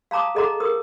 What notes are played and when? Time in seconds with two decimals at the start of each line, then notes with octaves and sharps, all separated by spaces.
0.11 F5 A5 A#5 D6 D#6
0.35 G#4 A4 D#5 F#5 A#5 D6
0.60 A#4 D#6